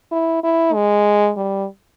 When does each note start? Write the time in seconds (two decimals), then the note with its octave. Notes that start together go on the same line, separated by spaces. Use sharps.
0.12 E4
0.44 E4
0.74 G#3
1.37 G3